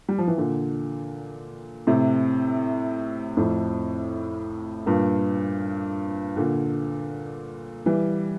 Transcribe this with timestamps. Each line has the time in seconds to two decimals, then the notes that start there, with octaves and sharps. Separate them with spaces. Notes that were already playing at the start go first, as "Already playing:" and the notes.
0.09 G3
0.18 F3
0.27 E3
0.38 A#2 D3
1.87 A2 C3
3.37 F2 A2
4.86 G2 A#2
6.37 A#2 D3
7.86 E3 G3